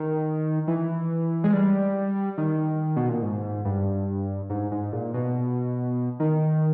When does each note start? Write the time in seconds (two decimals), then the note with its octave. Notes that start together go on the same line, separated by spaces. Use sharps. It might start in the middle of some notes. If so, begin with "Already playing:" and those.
Already playing: D#3
0.68 E3
1.44 G#3
1.53 G3
2.38 D#3
2.96 B2
3.09 A#2
3.22 G#2
3.65 G2
4.50 G#2
4.71 G#2
4.93 A#2
5.14 B2
6.20 D#3